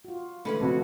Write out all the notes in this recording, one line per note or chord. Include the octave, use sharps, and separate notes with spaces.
F4 F#4
D3 E3 G#3 A3 B3 C#4 B5
F2 C3 F#4